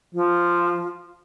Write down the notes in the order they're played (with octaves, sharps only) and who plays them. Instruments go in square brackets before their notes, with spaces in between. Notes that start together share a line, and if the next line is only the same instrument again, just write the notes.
[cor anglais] F3 [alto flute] F4